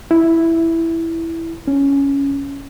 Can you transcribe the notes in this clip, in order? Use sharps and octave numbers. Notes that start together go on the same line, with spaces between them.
E4
C#4